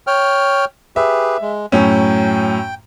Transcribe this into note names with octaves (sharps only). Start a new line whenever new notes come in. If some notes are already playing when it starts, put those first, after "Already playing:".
C#5 G5 F6
G4 G#4 B4 E5
G#3
F#2 A2 C#4 G5